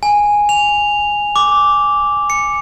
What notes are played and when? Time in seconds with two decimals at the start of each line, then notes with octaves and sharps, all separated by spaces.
0.03 G#5
0.49 F7
1.36 D6
2.30 C#7